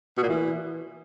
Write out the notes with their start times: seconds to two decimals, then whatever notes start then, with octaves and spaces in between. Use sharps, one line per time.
0.18 B2
0.23 A#2
0.29 E3